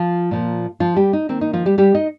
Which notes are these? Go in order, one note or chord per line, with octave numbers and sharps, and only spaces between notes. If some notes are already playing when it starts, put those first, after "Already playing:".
Already playing: F3 F4
A#2 F3 A#3
F3 F4
G3 G4
D#4
D#3 A#3 C4
D#4
F3 F4
G3 G4
G3 G4
D#4 D#5